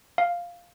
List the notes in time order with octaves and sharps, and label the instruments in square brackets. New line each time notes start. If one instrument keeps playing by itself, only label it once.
[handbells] F5